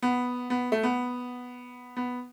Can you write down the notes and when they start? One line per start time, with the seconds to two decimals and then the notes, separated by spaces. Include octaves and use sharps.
0.02 B3
0.50 B3
0.72 A3
0.83 B3
1.97 B3